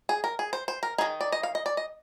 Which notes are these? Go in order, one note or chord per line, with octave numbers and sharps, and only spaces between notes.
G#4
A#4
G#4
C5
C5
A#4
D#3 G#3 D#4 G#4
D5
D#5
F5
D#5
D5
D#5